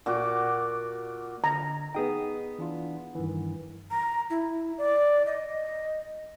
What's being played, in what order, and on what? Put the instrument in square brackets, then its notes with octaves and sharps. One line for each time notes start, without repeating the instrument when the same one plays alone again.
[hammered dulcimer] A#2 F#4 D6
[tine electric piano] D3 [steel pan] A#5
[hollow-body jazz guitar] B3 G#4 G5 [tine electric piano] D#4 D#6
[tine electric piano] E3 D4 F4
G2 D#3 E3
[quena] A#5
E4
D5
D#5